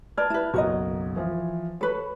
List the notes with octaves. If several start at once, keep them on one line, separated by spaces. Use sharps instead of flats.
B4 D5 A5 F6 G#6
E4 B4
F#1 B1 F#4 A#4 D#5
E3 F3
A4 B4 C#5 C#6